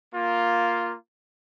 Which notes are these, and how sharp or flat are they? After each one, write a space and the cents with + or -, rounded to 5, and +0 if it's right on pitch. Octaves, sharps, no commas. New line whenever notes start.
A#3 +0 F4 +0